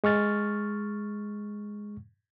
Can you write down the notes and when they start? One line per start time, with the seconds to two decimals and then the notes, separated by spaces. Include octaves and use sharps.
0.04 G#3 C#6 F6 A6